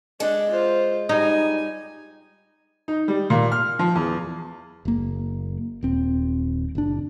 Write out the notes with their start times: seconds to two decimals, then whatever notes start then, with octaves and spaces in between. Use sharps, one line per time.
0.20 G#3 D4
0.50 F4 C5
1.09 G3 D#4 G#5
2.88 D#4
3.08 G3
3.30 A#2
3.52 F6
3.79 F3
3.95 E2
4.85 F#1 A#3
5.83 D#1 C4
6.75 F#1 D4